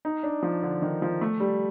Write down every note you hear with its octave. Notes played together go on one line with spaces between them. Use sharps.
D#4
D4
F3
D3
D#3
F3
A3
G3